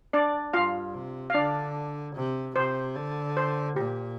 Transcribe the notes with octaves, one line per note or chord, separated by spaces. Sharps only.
D4 D5
G2 F4 F5
C3
F5
D3 D4 D5
C3
C3 C5
D3
C5
A#2 G4